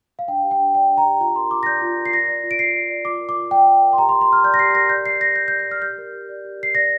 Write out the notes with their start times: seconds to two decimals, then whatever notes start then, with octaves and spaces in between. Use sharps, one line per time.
0.19 F5
0.28 D4 G5
0.43 G4
0.51 G5
0.59 D4
0.74 D5 G5
0.90 D4
0.98 A#5
1.05 G4
1.20 F4 A#5
1.36 A#4 C6
1.51 F4 D6
1.63 A#6
1.66 D5 G6
1.82 F4
1.97 A#4
2.06 C7
2.13 D5 A#6
2.28 D5
2.44 F4
2.51 D7
2.59 F4 C7
2.75 D5
2.90 D5
3.05 F4 D6
3.21 A#4
3.29 D6
3.36 F4
3.51 D5 G5
3.66 F4
3.82 A#4
3.93 C6
3.97 G4 A#5
4.09 C6
4.12 A#4
4.21 C6
4.28 G4 F6
4.44 D5 G6
4.54 A#6
4.59 G4 C7
4.74 A#4 A#6
4.89 D5 G6
5.05 D5 C7
5.20 G4 A#6
5.36 G4 G6
5.48 G6
5.51 D5
5.59 G6
5.67 D5 F6
5.82 G4 G6
5.98 A#4
6.13 G4
6.29 D5
6.45 G4
6.59 A#4 C7
6.75 D5 A#6